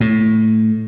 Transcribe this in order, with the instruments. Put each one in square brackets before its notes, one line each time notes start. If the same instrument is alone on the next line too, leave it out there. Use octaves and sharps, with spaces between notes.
[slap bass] A2